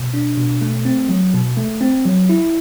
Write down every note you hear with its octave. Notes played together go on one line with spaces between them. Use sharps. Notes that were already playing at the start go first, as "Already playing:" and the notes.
Already playing: B2
D4
B2
A3
C4
F#3
B2
A3
C4
F#3
E4